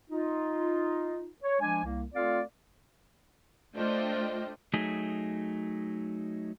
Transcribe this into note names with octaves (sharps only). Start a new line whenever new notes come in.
D#4 F4
C#5
F3 G#3 D4 G#5
C2 A#3
A3 C4 F4 A4 D5 F5
A3 D4 F4 C5 D#5 G5
F#3 A3 D#4 G#4